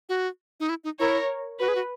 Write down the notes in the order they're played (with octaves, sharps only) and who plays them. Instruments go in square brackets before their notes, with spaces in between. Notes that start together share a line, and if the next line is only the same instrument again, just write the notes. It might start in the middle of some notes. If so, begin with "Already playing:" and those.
[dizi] F#4
D#4
E4
D#4
[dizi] E4 [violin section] A#4 C#5
[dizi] F#4 [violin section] B4
[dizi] G#4
F#4